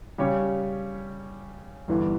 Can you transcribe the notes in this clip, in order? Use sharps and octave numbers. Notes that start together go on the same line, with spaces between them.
C#3 G3 C#4 G4 C#5
G1 G2 E3